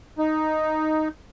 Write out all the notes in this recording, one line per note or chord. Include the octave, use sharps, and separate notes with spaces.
D#4